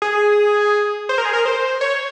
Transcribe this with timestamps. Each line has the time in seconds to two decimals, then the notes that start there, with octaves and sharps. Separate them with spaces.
0.02 G#4
1.09 C5
1.18 A#4
1.25 G#4
1.33 A#4
1.45 C5
1.81 C#5